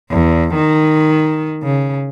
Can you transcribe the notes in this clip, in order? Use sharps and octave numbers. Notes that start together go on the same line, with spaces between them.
E2
D#3
C#3